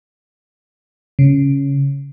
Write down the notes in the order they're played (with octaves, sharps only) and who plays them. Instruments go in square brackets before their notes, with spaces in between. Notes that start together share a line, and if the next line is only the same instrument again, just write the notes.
[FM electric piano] C#3